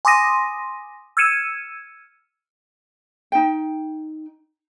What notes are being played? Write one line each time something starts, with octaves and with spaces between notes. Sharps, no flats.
G#5 C6 D6 D#6 A#6 D#7
E6 F6 G#6 C#7 D#7 E7
D#4 G5